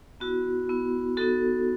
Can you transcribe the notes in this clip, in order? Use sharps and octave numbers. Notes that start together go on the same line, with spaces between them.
B3 E4 F#4
B3 E4
B3 D#4 F#4 A4